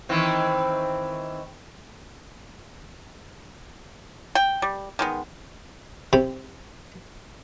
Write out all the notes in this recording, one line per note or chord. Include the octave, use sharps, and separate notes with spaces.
D#3 E3 C4
G5
G3
D#3 G#3 B3
C3